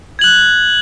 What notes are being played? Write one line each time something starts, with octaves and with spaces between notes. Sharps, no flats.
F#6 G#6 F#7